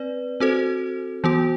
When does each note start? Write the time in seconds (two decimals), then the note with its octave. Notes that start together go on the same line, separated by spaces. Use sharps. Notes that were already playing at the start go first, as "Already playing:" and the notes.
Already playing: C4 B4 D5
0.40 C4 F#4 A4 C5
1.24 E3 B3 F#4